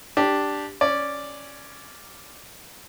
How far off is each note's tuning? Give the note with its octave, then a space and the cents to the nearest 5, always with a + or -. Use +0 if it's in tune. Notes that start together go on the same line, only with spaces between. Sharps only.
D4 +0 G4 +0
C#4 +0 D5 +0